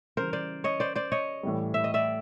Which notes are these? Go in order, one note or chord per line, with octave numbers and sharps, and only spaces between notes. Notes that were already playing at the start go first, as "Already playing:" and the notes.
C#3 E3 G3 A#4 C5
C5 D5
C#5 D#5
C5 D5
C5 D5
C#5 D#5
A2 E3 G3
E5
D#5
D5 E5